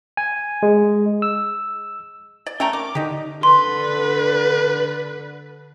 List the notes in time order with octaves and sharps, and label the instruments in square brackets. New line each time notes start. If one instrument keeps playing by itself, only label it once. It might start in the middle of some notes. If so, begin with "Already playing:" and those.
[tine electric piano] G#5
G#3
E6
[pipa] D5
[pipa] A3 G5 A#5 [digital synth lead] C#4
[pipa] A#4 [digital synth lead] D6
[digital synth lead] D3 [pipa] D#4 G4
[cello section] D3 [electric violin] B4 [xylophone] C6